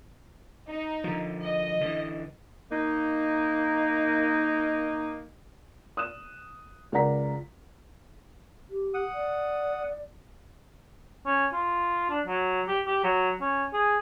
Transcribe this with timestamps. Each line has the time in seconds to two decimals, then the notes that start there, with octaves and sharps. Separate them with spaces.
0.67 D#4
1.04 D3 F3
1.43 D#5
1.81 D3 E3
2.72 A#3 D#4
5.97 D#6 F#6 E7
6.92 C#2 A#4 D5 F#5 A#5 B6
8.70 G4
8.94 F#5 D#6
9.14 D5
11.26 C#4
11.53 F4
12.10 D4
12.26 F#3
12.68 G4
12.87 G4
13.04 F#3
13.41 C#4
13.74 G#4